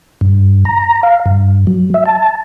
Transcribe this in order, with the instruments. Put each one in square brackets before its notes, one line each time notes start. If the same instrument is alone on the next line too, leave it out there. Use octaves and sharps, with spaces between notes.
[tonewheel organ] G2
A#5
F5
G2
F#3
E5
A5